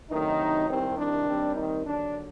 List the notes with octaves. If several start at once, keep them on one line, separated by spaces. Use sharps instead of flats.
D2 C3 D#3 F#3 A3 D#4
C2 C3 D#3 C4
D4
D#2 D#3 G3 C4
D#3 D#4
D#2 D3 F#3 D4